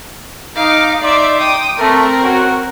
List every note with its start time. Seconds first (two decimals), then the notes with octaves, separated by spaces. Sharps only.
0.56 D#4 F5 D6
1.02 D#4 D5 E5 C6 D6
1.40 G5 D#6
1.77 A3 C4 A#4
2.21 C#4 F#4